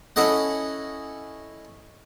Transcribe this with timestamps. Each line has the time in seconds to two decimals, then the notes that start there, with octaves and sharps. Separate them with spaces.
0.16 C#4 E4 A4 D#5 F#5